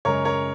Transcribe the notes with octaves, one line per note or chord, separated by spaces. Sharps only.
F#2 C#3 G#3 A#4 C#5
A#4 C#5